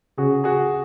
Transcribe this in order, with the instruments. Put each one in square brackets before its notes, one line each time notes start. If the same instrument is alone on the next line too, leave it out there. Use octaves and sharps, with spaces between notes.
[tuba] C#3 [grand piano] F#4 G#4
[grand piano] F#4 G#4